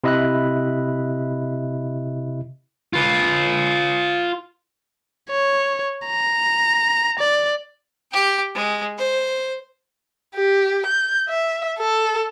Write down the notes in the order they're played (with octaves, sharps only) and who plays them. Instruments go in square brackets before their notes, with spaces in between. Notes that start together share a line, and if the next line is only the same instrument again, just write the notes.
[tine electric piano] C3 E4 D#5 E5 B5 F#6
[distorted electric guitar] F4 B4
[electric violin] C#5
A#5
D5
[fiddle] G4 G5
G#3
C5
[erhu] G4
G6
E5
A4